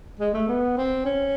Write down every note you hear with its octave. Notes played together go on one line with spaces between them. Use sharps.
G#3
A3
B3
C4
C#4